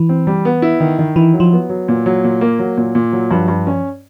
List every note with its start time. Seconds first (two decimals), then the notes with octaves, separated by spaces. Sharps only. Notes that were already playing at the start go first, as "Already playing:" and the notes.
Already playing: E3
0.09 C4
0.27 G3
0.45 B3
0.62 E4
0.80 D#3
0.99 D#3
1.16 E3 E4
1.34 F#3
1.40 F3
1.53 B3
1.69 F#3
1.88 A#2
2.06 F#3
2.24 A#2
2.41 A#3
2.59 F#3
2.77 A#2
2.95 A#2
3.13 F#3
3.31 G2 F3
3.48 G2
3.67 C#4